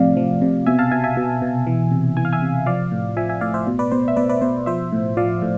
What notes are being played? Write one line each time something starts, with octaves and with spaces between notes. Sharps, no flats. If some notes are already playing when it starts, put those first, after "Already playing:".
Already playing: A2 C3 F3 D5 F5
F3
C3
B2 E5 G#5
F5 A5
B2 E5 G#5
E5 G#5
B2
B2
E3
C3
E3 G#5
F5
E5 G#5
C3
F3 D5 F5
A2
F3 E5 G#5
E5 G#5
A2 D5 F5
C5 E5
B2
B4 D5
B2 C5
E5
B2 B4 D5
B4 D5
B2 C5
F3 C5 E5
A2
F3 D5 F5
A2